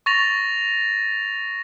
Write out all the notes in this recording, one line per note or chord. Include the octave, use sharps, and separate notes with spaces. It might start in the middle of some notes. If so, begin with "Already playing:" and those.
C#6 A6 A#6 F7